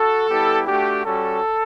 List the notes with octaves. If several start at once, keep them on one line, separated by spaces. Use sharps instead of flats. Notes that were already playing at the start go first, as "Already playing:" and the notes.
Already playing: F#4 A4
G3 B3 E4 G4
A3 D4 F#4 G4
G3 C#4 F#4 A4